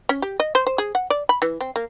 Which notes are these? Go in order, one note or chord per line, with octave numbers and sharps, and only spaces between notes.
C#4
G4
D#5
C5
C5
G#4
F#5
D5
B5
E3
C4
A#3